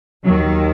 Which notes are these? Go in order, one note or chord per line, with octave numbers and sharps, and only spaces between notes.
D#2 D#3 F#3